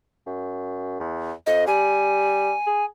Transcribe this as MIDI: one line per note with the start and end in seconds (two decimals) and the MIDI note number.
0.26 0.99 42
1.00 1.32 40
1.47 1.65 41
1.47 1.64 75
1.67 2.53 55
1.67 2.85 80
2.66 2.85 68